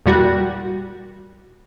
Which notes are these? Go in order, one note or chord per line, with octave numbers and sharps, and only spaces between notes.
E2 A#2 G3 F#4